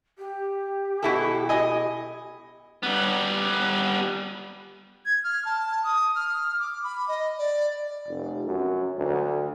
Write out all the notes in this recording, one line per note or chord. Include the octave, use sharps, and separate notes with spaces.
G4
B2 E4 A4
D#5 G#5
G3 B3
G#6
F6
A5
D#6
F6
D6
B5
D#5
D5
F1
F#2
D2